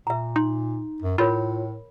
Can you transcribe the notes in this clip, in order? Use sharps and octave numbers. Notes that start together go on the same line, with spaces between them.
A#2 E5 A#5
D#4 C6
F#2
A2 F4 A#4 C#5 B5